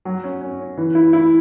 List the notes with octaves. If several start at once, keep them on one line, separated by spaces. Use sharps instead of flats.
F#3
C#4
C#4
C#4
E3
E4
E4